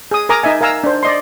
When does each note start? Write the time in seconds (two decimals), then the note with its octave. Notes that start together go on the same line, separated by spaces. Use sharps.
0.11 G#4 D#6
0.29 A#4 G#5 A#5 D6 D#6
0.43 D#4 D#5 E5 G#5
0.61 A#4 F5 G#5 A#5 E6
0.84 D4 C5
1.03 D5 D#5 C6